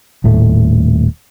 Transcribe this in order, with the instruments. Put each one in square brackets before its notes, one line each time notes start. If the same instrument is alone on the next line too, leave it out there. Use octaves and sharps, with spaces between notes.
[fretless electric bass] D#1 A2 A3